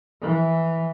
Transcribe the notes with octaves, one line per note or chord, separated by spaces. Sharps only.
E3